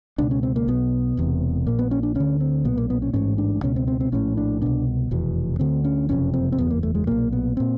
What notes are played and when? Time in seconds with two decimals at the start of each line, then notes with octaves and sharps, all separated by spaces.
0.18 C#2 B2 D4
0.31 C#4
0.43 C4
0.56 A#3
0.68 B1 B2 B3
1.17 E1 E2 C3
1.67 A#1 A#2 A#3
1.79 B3
1.91 C#4
2.03 D4
2.15 D2 D3 C#4
2.40 C4
2.65 B1 A#2 B3
2.77 A#3
2.90 B3
3.02 C#4
3.13 A1 G#2 C#4
3.38 D4
3.63 C#2 B2 C#4
3.76 C4
3.88 C4
4.00 C4
4.12 A#1 A2 C#4
4.37 D4
4.62 C2 B2 D4
5.11 F1 E2 B2
5.59 D2 D3 C4
5.85 C#4
6.09 F#1 F2 C3 C#4
6.34 C4
6.52 C4
6.58 F#1 E2 B2 B3
6.71 A#3
6.83 A3
6.95 G#3
7.07 B1 A#2 A#3
7.32 B3
7.57 A#2 C4